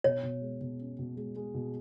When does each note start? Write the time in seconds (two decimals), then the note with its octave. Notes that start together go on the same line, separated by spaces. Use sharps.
0.04 B2 C#5
0.23 B2
0.42 G#3
0.61 B2
0.79 C#4
0.99 B2
1.17 G#3
1.36 G#3
1.54 B2